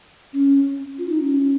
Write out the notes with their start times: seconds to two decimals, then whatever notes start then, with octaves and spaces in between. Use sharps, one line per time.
0.33 C#4
0.98 F4
1.09 D#4
1.20 C#4